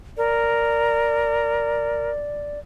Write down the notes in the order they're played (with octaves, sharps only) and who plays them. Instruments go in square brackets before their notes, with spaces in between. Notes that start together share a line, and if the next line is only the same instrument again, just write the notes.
[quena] A#4 [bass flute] D5